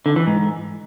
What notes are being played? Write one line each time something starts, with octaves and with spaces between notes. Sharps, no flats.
D3
E3
G#2